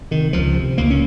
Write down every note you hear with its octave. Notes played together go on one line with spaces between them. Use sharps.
C3 D#3
C#2 F3
C3
C#2 A#3
C#4